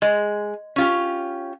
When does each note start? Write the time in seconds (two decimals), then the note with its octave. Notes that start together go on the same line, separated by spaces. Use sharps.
0.02 G#3 D#5
0.76 C#4 F4 G4